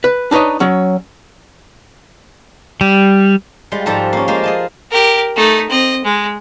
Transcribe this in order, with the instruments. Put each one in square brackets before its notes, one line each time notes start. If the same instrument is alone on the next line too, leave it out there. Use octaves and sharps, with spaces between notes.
[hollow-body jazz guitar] B4
D4 D#4 B4 C#5 D#5
F#3 C#4
[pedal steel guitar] G3
[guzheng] G3 G#3 F4
G#2 F3 G3 A4 A5 A#5
A#3 C#4
G#3 A#3 F4 C5
G#4 D#5 A5
[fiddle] G4 A#4
A3 D#4
C4 D#5
G#3